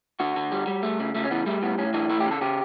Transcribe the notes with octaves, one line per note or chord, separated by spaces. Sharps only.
D3 F#4
D3
G3
G3
A3
C#3
C#3 A3
C#4
E3 B3
G3 A3
A2 B3
A2 C#4
E3 D4
A3 E4
G4
C#3 A4
C#3 G4